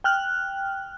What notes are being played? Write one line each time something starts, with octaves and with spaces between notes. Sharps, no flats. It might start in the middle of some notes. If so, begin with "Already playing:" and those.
G5 F6 F#6